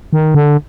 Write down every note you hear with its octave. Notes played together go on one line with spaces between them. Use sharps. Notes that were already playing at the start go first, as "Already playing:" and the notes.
D#3
D3